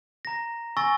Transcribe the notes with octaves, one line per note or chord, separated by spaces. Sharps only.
A#5 A#6
G#5 C#6 E6 A6 A#6